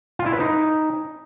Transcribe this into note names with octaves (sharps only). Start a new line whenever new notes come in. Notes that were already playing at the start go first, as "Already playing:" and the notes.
F4
E4
B4
D#4